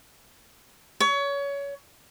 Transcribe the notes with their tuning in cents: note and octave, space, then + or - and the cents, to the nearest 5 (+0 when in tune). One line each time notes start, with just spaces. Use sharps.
C#5 +25